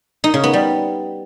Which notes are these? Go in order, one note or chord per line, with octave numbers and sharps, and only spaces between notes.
D#4
C#3
B3
G3